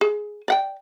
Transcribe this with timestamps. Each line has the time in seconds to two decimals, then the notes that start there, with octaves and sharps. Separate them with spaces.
0.01 G#4
0.48 D5 F#5 G5